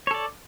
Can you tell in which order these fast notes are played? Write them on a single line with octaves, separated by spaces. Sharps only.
C#5 A4 D5